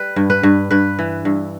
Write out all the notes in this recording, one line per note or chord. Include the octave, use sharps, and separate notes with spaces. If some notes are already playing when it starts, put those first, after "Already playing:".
Already playing: G3 B4
G2
B4
G2
G2 B4
E3
G2